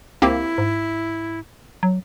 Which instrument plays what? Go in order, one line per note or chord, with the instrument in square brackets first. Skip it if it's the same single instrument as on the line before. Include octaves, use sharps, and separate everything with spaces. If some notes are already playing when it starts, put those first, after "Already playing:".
[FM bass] C#2 [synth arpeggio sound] A#3 C4 G4 [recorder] E4
[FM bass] G#2
F#3